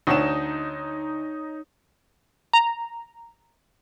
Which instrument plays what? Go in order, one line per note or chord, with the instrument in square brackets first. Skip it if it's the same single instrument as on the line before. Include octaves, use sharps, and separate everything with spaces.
[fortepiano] D2 [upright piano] D#4 C#5 E7
[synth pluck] A#5